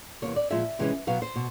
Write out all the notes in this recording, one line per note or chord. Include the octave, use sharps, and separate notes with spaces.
E2 C3 D#3 F#3 A#3 C#5
D5
A#2 F3 G#3 E5
C3 E3 G#3 C#4
B2 F#3 B3 F5
C5
B2